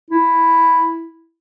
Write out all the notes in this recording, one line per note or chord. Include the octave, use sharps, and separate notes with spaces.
E4